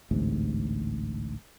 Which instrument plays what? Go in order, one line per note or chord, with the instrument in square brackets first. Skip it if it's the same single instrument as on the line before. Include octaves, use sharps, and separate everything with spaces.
[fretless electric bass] A1 D2 G#2 C3